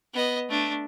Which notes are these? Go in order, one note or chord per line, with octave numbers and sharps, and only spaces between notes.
B3 D#5
A3 D4